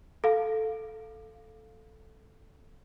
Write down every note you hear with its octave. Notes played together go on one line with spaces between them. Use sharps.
A4 F5